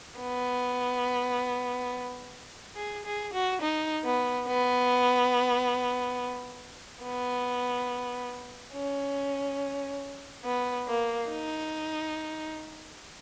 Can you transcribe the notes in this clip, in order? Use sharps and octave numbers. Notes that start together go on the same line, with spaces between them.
B3
G#4
G#4
F#4
D#4
B3
B3
B3
C#4
B3
A#3
D#4